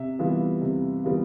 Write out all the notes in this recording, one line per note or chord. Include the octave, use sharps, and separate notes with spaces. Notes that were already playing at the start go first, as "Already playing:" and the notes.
Already playing: C3 E5
E3 G3 B3 F4
C3
E3 G3 B3 F4